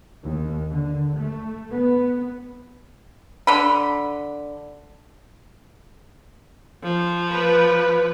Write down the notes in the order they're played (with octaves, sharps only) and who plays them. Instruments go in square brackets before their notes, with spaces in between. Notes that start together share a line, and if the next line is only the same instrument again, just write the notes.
[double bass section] D#2
D3
A3
B3
[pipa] D3 B5
[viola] F3
[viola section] B4